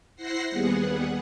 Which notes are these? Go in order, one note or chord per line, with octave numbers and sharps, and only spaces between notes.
E4 C5 F#5 A#6 C7
D#2 G3 B3 G#4 F#5